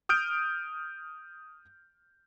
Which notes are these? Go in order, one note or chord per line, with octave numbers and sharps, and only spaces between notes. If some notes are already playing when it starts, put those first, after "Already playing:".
D#6 F6 G6 D7